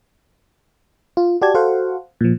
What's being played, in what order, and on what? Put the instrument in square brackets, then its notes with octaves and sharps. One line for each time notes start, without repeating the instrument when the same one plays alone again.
[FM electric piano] F4
F#4 G4 D5 A5 G#6
F#4 A4 C5 F5 F#5
A#2 F3